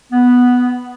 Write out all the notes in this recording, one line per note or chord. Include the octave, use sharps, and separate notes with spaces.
B3